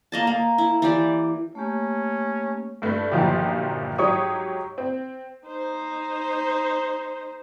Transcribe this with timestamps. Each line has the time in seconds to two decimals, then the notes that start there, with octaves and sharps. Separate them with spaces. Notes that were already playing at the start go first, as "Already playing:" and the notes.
0.12 A#3 D#5 A5
0.27 A#3
0.58 E4
0.82 E3 G4 D5
1.55 A3 A#3 C#4 G4
2.82 G2 A3 B4
3.11 G1 A#2 D#3 F3 F#3 G4
3.98 G#2 F#3 G4 C#5 C#6 D#6
4.78 C4
5.47 D#4 C5